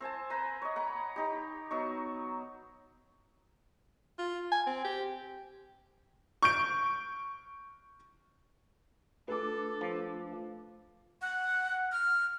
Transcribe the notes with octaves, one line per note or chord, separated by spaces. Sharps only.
C4 C5 G#5 A5
B4 C5 G#5 A#5
C#5 D#5
F#5 A#5 B5
D#4 G4
F#3 B3 D#4 C#6
F4
G#5
C4
G4
C#6 G6 D7
A3 D4 F4 A4 B4 D6
F3
F#5
F6